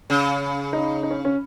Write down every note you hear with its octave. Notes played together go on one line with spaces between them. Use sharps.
C#3
D#4
D#4
C#4
C#4